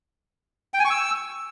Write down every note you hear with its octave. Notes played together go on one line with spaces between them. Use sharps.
G5
G#5
C#6
E6